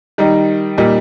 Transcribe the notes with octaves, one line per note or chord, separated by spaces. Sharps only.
D#3 G3 D#4
A#2 G3 D#4